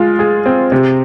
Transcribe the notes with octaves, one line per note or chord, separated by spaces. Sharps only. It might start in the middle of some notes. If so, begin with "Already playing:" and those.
Already playing: G#3 F4
G#4
C4
C3